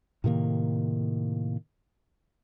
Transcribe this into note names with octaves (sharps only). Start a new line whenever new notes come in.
A2 C3 D#3 A#3